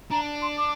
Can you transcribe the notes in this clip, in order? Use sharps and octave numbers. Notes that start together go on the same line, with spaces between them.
D4 A#5
C6
D6